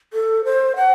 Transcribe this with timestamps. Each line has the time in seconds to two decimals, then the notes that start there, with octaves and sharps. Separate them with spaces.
0.13 A4
0.45 C5
0.76 F#5